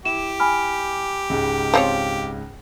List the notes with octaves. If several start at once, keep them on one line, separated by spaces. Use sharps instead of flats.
E4 G4 E7
G#5 B5 F6
C#2 G#2 C#3
F3 C4 C#5